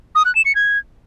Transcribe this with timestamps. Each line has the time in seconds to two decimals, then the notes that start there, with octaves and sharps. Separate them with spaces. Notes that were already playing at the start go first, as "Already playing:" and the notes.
0.15 D#6
0.25 F#6
0.35 E7
0.45 C#7
0.55 G#6